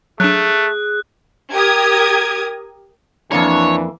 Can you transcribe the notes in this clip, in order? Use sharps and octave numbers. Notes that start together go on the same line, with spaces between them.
F#3 A3 D4 G#4 F#6
G4 A#4 D#6 G#6
F2 E3 A#3 D4 C#5 A#5